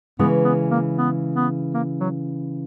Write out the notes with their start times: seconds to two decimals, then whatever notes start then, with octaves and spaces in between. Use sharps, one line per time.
0.19 C#3 E3 G#3 B3
0.44 B3
0.71 A#3
0.97 B3
1.35 B3
1.74 A#3
2.00 F#3